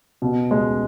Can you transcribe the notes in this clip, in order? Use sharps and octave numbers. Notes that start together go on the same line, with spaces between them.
B2
G#3